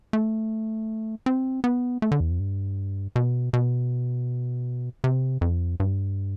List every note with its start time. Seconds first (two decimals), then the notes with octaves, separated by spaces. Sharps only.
0.13 A3
1.26 C4
1.64 B3
2.02 A3
2.12 D3
2.20 E2
2.30 F2
2.40 G2
3.16 B2
3.53 B2
5.04 C3
5.41 F2
5.80 G2